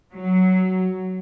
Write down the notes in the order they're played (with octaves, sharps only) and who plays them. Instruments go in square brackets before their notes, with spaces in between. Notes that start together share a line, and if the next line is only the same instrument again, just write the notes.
[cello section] F#3